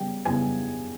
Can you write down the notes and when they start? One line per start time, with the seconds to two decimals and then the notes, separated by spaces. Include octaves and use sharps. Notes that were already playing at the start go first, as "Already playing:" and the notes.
Already playing: C#3 G3 B3 G5
0.25 C#3 G3 B3 G#5